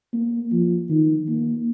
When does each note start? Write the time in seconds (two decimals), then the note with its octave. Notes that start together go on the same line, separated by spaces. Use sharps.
0.13 A#3
0.52 F3
0.90 D#3
1.28 A#3